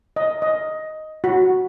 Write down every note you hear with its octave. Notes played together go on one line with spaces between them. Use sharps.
D#5
D#5
F#4